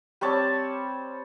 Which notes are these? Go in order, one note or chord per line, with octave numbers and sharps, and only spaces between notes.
G3 C4 C#5 A5